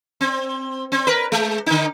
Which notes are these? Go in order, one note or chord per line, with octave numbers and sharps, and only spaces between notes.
C4
C4
A#4 B4
G#3
D3 D#4